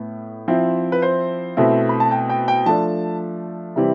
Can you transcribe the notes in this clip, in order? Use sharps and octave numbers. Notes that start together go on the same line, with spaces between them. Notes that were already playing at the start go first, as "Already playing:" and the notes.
Already playing: A2 B3
F3 C4 E4
B4
C5
B2 A3 C4 E4
B5
A5
G5
G5
G5
F3 A3 D4 A5
C3 E3 G3 C4 E4